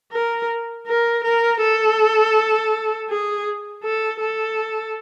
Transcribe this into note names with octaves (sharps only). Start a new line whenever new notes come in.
A#4
A#4
A#4
A4
G#4
A4
A4